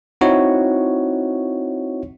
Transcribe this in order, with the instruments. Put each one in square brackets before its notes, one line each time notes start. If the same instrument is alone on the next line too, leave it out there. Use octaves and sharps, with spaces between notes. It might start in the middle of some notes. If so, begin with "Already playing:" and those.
[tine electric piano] C4 D#4 E4 F#4 C#5